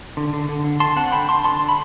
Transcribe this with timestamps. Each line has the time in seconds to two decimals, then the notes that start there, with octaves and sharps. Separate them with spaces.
0.17 D3
0.33 D3
0.49 D3
0.64 D3
0.80 D3 A5 C6
0.96 C4 F#5 A5
1.12 D3 G5 B5
1.28 D3 A5 C6
1.44 D3 A5 C6
1.60 D3
1.69 B5